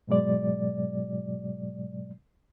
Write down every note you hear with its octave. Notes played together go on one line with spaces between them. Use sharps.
G#2 B2 F#3 G#3 D5